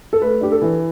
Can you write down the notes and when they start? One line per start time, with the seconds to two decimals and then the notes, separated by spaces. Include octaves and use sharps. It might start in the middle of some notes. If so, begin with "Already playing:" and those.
0.13 A4
0.22 A3 B4
0.41 D4 G4
0.52 A4
0.62 E3